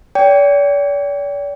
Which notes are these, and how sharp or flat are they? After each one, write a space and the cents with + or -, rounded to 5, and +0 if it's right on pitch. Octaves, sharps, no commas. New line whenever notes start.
D5 -45 G5 +0